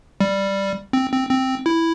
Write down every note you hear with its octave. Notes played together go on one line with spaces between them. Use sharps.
G3
C4
C4
C4
E4